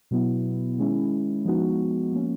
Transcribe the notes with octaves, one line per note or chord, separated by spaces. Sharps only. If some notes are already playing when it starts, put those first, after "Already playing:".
B2 F#3 B3 E4
D#3 G#3 C#4 E4
F3 G#3 B3 D#4 F#4
F3 A#3 C#4